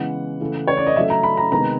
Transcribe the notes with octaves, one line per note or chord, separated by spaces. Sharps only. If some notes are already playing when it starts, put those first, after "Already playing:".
Already playing: C#3 E3 G#3 B3 F#5
C#3 E3 A3
C#5
D5
D#5
C#3 F#3 A3 E5
A#5
B5
A#5
C3 D#3 G#3 B3 A#5